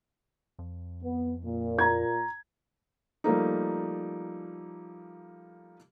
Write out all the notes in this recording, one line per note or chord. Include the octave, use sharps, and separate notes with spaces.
F2
B3
A#2
A#5 G#6
F3 G3 A3 A#3 D#4